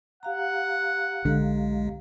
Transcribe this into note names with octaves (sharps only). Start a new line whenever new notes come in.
G4 F5 F#5 A#5
B1 D3 G#3